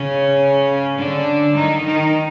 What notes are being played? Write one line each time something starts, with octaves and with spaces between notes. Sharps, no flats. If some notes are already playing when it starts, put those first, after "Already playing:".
Already playing: C#3 C#4
D3 D4
D#3 D#4
D#3 D#4